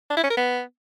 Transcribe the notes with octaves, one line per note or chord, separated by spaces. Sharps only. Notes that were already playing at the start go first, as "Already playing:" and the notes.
D4
E4
C#4
A#4
B3